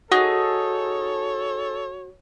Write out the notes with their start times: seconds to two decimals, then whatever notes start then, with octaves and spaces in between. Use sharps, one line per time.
0.12 D#4 F#4 G#4 A4 C#5